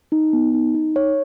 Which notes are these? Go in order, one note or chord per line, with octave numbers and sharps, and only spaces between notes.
D#4
B3
D#4
D#4
C#5